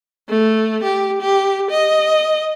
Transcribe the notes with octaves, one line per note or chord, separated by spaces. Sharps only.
A3
G4
G4
D#5